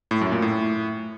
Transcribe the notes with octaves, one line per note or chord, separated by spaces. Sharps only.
A2
F#2
A#2
A2